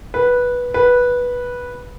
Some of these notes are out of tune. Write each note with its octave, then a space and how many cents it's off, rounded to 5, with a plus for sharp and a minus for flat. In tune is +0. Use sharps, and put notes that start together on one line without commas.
B4 -10
B4 -10